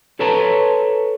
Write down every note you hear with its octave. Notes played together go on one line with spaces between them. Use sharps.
A4 B4 C#5 A5 A#5